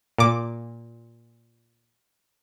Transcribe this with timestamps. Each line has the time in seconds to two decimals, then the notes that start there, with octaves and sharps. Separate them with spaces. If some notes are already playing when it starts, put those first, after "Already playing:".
0.18 A#2 D6